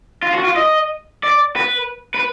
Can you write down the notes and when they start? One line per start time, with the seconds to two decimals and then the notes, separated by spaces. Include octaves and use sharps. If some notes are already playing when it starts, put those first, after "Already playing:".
0.23 F4
0.34 F#4
0.44 F4
0.56 D#5
1.23 D5
1.56 B4
2.14 B4